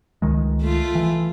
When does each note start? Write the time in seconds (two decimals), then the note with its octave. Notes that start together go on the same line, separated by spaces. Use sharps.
0.22 C#2 D#3 G#3
0.61 A3 F4
0.95 E3